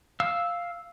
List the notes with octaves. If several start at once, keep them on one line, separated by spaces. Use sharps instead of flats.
F5 E6